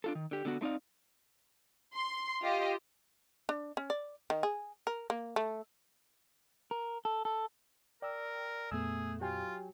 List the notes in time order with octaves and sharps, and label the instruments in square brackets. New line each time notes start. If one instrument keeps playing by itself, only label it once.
[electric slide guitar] D4 F4 A4
D#3
D3 G4
D3 B3 F#4
A3 C4 D#4 D5 F5
[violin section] C6
F4 G4 D#5
[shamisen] D4
C#4
D5
D#3
G#4
A#4
A#3
A3
[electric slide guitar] A#4
A4
A4
[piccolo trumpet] A#4 [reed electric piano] D5 E6 [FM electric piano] G5
[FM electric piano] F2 A#2 B3 [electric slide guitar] A3 [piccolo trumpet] G#4 [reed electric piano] E6
[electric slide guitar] F#3 [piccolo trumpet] F4 [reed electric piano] G4 G5 G#5